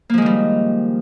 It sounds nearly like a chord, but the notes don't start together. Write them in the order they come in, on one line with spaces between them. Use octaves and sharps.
A#3 F3 G#3 D#3 G3